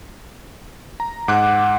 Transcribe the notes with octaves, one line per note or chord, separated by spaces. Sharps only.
A#5
G#2 F#5 D6 F#6